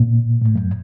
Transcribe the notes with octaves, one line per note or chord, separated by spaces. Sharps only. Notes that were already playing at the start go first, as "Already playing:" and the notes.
Already playing: A#2
A2
F#2